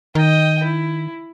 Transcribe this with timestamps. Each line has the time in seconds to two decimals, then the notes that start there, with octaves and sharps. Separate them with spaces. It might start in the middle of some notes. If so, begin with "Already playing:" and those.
0.15 D#3 D#5 G5
0.64 E4